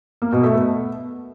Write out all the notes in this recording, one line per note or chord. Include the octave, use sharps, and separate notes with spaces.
A#3
B2
A3
B3